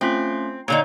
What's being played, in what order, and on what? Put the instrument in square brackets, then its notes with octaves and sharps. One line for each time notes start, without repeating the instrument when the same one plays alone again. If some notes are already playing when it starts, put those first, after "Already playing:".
[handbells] A3 C#4 F4 [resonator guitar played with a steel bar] C4
[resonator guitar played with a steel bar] A#2 D3 D#4 [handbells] C#5